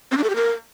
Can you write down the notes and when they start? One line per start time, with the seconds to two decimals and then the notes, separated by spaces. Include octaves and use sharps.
0.11 C4
0.17 D4
0.24 A4
0.30 G4
0.36 A#4